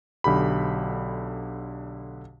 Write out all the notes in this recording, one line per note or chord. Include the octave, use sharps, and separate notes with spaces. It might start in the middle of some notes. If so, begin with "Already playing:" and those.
B1 D3 G4 B5